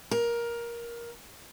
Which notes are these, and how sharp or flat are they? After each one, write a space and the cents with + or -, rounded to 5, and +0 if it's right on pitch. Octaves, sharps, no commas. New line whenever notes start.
A#4 +15